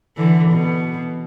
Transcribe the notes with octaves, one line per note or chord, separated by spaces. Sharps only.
D3 E3
B2